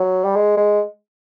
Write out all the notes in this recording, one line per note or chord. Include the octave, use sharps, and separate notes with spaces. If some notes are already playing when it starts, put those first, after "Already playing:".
Already playing: F#3
G3
G#3
G#3